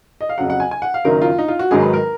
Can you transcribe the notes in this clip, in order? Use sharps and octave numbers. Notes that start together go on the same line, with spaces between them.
D#5
F5
F2 C#3 F#3 F#5
F#5
G#5
G#5
F#5
F5
F#1 F#2 D#3 F#3 A#4
F4
D#4
F4
F#4
G#1 G#2 D#3 F#3 G#4
B4
A#4